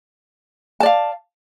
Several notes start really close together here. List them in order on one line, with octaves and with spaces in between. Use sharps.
A5 D5 F5